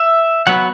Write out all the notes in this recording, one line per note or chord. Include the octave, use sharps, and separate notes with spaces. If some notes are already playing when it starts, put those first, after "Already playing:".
Already playing: E5
F#3 B3 F#5